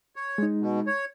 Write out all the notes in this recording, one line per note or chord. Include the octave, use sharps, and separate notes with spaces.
C#5
G#3 D#4
B2
C#5